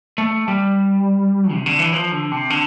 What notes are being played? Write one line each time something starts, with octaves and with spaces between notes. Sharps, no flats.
A3
G3
C3
D3
E3
F3
D3
C3
D3